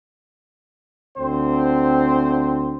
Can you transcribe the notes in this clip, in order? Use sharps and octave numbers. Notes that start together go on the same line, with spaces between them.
D2 C4 C5